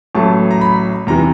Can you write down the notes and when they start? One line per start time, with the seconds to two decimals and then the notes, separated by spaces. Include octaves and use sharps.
0.15 A1 A2 F#3 A3 A5
0.51 A#5
0.61 B5
1.07 E2 C3 E3 A#5